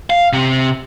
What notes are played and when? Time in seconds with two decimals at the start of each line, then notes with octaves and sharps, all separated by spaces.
0.10 F5
0.33 C3